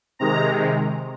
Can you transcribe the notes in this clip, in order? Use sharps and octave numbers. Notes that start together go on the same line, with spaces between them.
C3 D#3 G#3 A#5